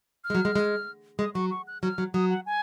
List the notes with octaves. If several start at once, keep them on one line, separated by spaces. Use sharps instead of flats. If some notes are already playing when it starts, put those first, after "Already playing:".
F6
G#3
F#3
G#3
G#3
G#3 D#6
F#3 C#6
C#6
F#6
F#3 F6
F#3
F#3 D#6
F#5
G#5